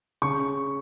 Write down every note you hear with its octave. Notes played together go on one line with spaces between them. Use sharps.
C#3 C#6